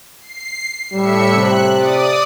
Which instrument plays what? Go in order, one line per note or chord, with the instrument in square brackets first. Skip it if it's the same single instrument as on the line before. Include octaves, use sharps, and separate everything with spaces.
[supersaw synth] C7
[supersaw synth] A2 E5 C#7 [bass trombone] G3
[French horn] C3 [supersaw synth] F#6
[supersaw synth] D5 D#6